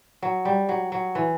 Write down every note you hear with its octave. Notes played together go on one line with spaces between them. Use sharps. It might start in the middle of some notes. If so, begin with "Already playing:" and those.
F#3
G3
F#3
F#3
E3